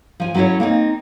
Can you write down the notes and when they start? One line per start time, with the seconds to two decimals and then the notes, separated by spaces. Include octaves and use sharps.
0.20 F3 G#5
0.34 F#3 C#4 E4 A4 C#5
0.60 A#3 C4 D#4